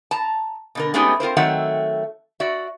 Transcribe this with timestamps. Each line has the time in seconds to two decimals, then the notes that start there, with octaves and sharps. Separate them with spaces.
0.11 A5 A#5
0.75 B2 D3 A#4
0.94 G#3 A3 B3 C#4 D#4 G4
1.20 C4 F4 A#4 C5
1.37 D#3 F#3 A3 C4 E5 F#5
2.40 F#4 D5 E5